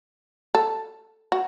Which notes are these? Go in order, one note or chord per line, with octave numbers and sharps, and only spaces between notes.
A4
F#4